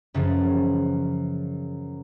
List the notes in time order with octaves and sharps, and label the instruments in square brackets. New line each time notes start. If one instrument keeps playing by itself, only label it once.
[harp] F#2 C#3 E3 F3